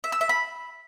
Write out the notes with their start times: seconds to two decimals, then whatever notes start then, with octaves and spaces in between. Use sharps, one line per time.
0.04 E5
0.12 E6
0.21 E5
0.29 B5